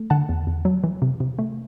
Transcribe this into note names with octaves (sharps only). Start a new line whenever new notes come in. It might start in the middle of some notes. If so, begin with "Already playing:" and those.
Already playing: A3
D3 F#5 A5
E2
E2
F#3
E3
C3
C3
A3